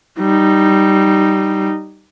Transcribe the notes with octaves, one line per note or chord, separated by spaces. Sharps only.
G3 D#4